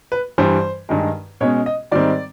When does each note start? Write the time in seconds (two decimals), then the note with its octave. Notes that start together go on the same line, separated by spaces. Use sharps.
0.12 B4
0.38 G2 E3 G3 C5
0.89 G2 D#3 G#3
1.41 B2 G#3 C#4 C#5
1.66 D#5
1.92 G#2 D#3 G3 C4 D5